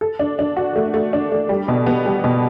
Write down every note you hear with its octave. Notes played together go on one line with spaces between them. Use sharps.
A4
D4
D4
F#4
A3
A3
D4
A3
G3
B2
B3
G3
B2